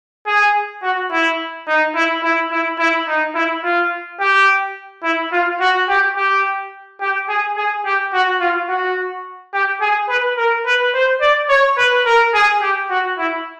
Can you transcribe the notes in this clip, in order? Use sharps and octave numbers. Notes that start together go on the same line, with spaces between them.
G#4
F#4
E4
D#4
E4
E4
E4
E4
D#4
E4
F4
G4
E4
F4
F#4
G4
G4
G4
G#4
G#4
G4
F#4
F4
F#4
G4
G#4
B4
A#4
B4
C5
D5
C#5
B4
A#4
G#4
G4
F#4
E4